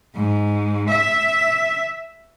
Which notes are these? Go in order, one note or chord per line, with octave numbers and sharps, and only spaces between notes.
G#2
E5